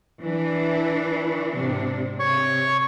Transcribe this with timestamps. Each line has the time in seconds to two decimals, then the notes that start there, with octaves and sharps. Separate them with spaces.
0.23 E3 D4
1.52 G#2 C3 D4
2.19 C3 C#5 C#6